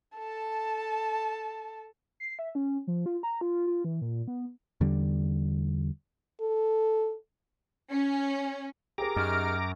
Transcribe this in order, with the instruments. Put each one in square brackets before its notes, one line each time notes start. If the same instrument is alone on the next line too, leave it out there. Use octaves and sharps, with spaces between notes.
[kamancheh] A4 A5
[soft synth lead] C7
E5
C#4
F3
F4
A#5
F4
F4
E3
A#2
B3
[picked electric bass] E2 D3 G3
[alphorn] A4
[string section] C#4
[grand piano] G4 G#4 A#4 [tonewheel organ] A#5 D6
[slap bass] F#2 [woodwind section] D#4 F6